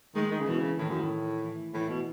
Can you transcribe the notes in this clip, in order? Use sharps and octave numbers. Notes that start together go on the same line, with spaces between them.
D#3 G#3
D#3
C#3
B2 E3
C#3
A2 D#3
F#2
A2
E3
A2 E3
B2